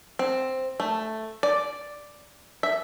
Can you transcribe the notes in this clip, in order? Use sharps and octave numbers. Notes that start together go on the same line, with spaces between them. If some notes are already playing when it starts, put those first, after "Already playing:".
C4
A3
D5
E5